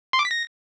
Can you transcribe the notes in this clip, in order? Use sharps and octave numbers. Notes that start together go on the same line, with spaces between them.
C6
D6
B6
A#6